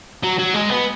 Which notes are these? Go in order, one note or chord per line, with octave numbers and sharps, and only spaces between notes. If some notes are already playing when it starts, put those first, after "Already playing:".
F#3
F#3
G#3
B3